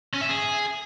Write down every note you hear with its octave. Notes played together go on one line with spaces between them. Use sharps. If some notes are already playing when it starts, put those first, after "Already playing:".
C#4
E5
G#4